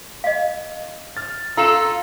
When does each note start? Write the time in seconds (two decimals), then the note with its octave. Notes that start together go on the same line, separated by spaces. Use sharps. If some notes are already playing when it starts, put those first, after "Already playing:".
0.24 D#5 F5
1.17 F6 A6
1.57 F4 A4 A#5 E7